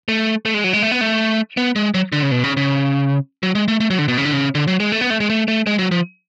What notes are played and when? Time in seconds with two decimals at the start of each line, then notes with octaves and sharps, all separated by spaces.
0.08 A3
0.45 A3
0.54 G#3
0.64 F#3
0.73 G#3
0.83 A3
0.92 B3
1.01 A3
1.57 B3
1.76 G#3
1.94 F#3
2.12 D3
2.22 C#3
2.31 B2
2.44 C#3
2.57 C#3
3.43 F#3
3.55 G#3
3.68 A3
3.80 A3
3.90 F#3
3.99 D3
4.08 B2
4.18 C#3
4.25 D3
4.33 C#3
4.55 D3
4.68 F#3
4.80 G#3
4.92 A3
5.01 B3
5.10 A3
5.20 G#3
5.30 A3
5.48 A3
5.67 G#3
5.79 F#3
5.91 F3